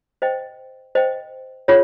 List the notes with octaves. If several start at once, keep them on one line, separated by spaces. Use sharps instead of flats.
C5 D#5 G5
C5 D#5 G5
F4 G#4 C#5